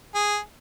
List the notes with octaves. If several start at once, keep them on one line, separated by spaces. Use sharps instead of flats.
G#4